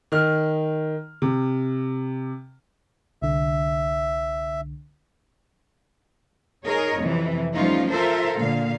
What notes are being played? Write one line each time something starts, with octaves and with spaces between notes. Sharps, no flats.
D#3 F6
C3
C2 D3 E5
D#4 G#4 A#4 C#5 D#5
F2 C3 E3
F3 G3 A3 C#4 D#4 F4
F4 A4 A#4 C5 E5
A#2 D3 F5